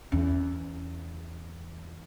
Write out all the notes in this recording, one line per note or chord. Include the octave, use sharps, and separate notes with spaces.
E2 C#4